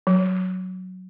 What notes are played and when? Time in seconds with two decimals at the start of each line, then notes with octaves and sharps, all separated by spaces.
0.07 F#3